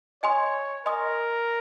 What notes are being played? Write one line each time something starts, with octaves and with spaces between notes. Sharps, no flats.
C#5 D#5 G#5 C6 D#6
A#4 D#5 G#5 C6 D#6